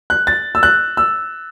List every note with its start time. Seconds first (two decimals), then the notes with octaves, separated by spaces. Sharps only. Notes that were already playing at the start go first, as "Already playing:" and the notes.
0.10 F#6
0.27 A6
0.55 E6
0.63 F#6
0.97 E6